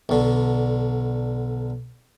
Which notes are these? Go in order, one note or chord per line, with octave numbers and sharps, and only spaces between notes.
B1 D3